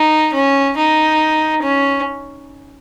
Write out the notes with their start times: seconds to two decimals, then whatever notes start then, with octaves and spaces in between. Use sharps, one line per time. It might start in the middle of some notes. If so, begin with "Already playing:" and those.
Already playing: D#4
0.33 C#4
0.76 D#4
1.62 C#4